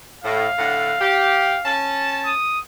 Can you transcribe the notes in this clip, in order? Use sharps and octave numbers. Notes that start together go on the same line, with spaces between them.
A2 F5
A2 D3 F#5
G4
C#4 A5
D#6